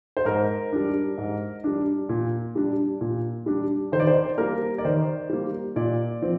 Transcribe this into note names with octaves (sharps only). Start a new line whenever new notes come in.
C5
G#2 A#4
G3 D4
G#2
G3 D4
A#2
G3 D4
A#2
G3 D4
D#3 C5
D5
C5
G3 A#3 A#4
D5
D#3 C5
G3 A#3
A#2 D5
F3 C4